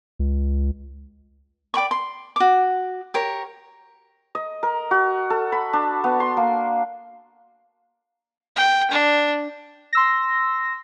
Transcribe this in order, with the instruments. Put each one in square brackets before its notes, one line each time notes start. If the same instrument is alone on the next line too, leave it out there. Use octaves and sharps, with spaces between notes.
[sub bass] C#2
[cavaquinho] D5 G5 B5 C#6
C6
F#4 D6
G4 A#4 C#5
[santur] D#5
A#4
F#4
A4
B5
D4
B3
C6
A#3
[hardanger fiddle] G5
D4
[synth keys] C6 E6 A#6